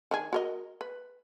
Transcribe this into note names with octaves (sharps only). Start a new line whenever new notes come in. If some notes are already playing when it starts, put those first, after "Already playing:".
D#3 D4 G#4
F#4 A#4 D#5
B4